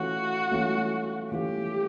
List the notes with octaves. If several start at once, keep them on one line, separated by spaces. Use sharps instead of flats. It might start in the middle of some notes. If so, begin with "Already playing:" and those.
Already playing: E3 A3 C#4 F4 F#4
E3 A3 C#4 F4
E3 A3 C#4 F4 G4